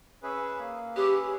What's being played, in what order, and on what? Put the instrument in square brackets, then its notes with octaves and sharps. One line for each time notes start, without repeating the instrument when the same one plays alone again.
[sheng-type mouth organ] C#4 G#4 B4 E5
A#3
[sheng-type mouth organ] C#4 G#4 B4 E5 [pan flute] G4